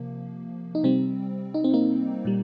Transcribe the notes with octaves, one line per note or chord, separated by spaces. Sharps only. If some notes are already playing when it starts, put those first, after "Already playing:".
Already playing: C3 F3 A#3
D#4
C3 G3 C4
D#4
C4
A#3 D#4
A#2 G3